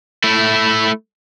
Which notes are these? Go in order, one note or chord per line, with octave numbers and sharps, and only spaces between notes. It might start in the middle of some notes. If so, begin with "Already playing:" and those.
A3 E4